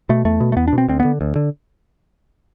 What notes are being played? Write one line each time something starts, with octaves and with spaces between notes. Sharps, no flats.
B2 A3
E2 A3
B2
A3
E2 B3
D4
B2
C4
D2 C4
B3
D3
D2
D3